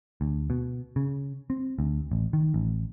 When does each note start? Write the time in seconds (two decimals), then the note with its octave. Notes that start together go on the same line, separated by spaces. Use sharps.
0.21 D2
0.50 B2
0.96 C#3
1.50 C4
1.79 D2
2.11 A1
2.33 D#3
2.54 A1